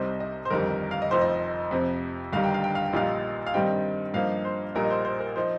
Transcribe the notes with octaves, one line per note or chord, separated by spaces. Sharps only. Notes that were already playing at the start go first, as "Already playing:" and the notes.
Already playing: C2 C3 G3 D#4 C5
D#5
C5
G1 F2 D#3 G3 A#4
F5
D#5
F1 F2 F3 D#4 C5
D#5
F2 C3 F3
G1 G2 D#3 G3 F5
G5
F5
G5
F5
G5
A#1 A#2 G3 D#4 F5
F5
G2 D#3 G3 C4 D#4 G5
G2 F3 A#3 D#4 F5
C5
A#1 A#2 G3 D#4 A#4
D#5
C5
C5
A#4
F3 D#4 C5